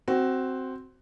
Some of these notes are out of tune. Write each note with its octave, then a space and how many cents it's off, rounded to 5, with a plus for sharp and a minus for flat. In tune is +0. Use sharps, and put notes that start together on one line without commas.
C4 +0 F#4 +15